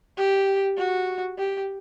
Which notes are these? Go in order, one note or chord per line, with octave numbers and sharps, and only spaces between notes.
G4
F#4
G4